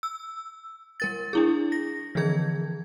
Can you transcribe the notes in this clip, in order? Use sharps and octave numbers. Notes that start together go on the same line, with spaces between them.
E6
G3 A#4 A6
D4 E4 G#4
A#6
D3 E3 F3 G#4 G#6